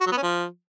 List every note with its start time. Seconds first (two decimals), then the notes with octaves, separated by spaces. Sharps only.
0.01 F#4
0.06 F#3
0.12 B3
0.17 C#4
0.23 F3